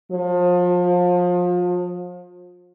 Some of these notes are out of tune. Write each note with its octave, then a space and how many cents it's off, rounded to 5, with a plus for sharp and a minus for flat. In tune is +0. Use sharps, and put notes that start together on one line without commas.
F3 +30